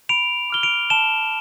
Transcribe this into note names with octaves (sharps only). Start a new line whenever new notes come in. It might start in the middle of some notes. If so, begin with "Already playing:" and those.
B5 D7 F7
D6 F6 G7
D7 F7
A5 E7 G7